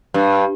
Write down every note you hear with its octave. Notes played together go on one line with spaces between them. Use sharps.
G2